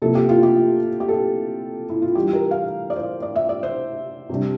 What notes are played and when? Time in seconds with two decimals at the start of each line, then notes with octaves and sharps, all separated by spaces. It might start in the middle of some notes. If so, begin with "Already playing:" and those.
0.02 C3 F3 A#3 A4
0.15 G4
0.29 F4
0.43 G4
1.00 G4
1.09 A4
1.90 E4
2.02 F4
2.15 E3 G3 D4 G4
2.33 A#4
2.51 F5
2.90 D5
2.96 C5
3.22 D5
3.36 E5
3.49 D5
3.63 C5
4.30 C3 G3 D4